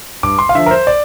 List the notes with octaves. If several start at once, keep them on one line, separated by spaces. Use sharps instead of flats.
G2 D6
C6
F5
D3 F3 E5
A#4
C5
D5